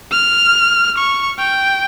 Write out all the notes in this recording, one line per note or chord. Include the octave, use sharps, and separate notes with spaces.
F6
C#6
G5